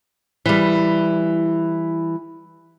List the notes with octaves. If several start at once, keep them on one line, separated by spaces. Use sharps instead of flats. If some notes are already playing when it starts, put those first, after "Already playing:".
E3 G3